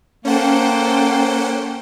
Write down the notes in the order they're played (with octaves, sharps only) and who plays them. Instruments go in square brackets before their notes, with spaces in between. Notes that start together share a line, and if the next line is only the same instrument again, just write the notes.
[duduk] A#3 [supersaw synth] C#4 F#5 [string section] A4 C5 G5